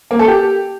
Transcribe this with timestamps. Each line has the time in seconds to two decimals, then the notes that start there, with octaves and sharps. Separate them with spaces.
0.11 A#3
0.19 A4
0.28 G4